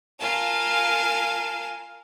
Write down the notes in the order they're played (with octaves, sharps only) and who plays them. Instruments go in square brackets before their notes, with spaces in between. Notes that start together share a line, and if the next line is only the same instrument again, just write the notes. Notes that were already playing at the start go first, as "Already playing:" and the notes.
[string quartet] F4 A#4 F5 G#5 A5